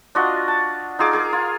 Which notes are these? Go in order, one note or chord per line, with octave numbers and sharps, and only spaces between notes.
D4 F4 F#4 D#5
A5
D#4 F4 G#4 D6
G#4 A#4 D6
F4